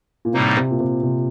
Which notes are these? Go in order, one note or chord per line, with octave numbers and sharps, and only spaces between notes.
A#2
A2 C3 G3 A#3 D#4
C3
A#2
C3
C3